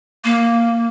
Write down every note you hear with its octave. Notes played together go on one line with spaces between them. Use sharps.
A#3